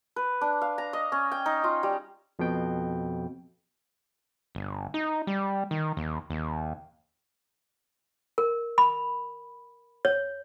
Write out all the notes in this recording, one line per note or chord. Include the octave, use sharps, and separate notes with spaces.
B4
D4
F5
A#5
D#5
C#4
G5
D#4
F4
G3
F2 B2 G5
G1
D#4
G3
D#3
D#2
D#2
A#4
B5
C#5